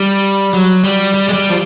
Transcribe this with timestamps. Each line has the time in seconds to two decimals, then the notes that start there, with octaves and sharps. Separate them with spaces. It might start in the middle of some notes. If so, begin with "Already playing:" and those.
Already playing: G3
0.53 F#3
0.84 G3
1.14 G3
1.29 G#3
1.33 G3
1.50 F3